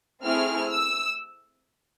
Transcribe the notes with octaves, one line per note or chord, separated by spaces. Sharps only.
A3 C4 E4 G#4 F6
E6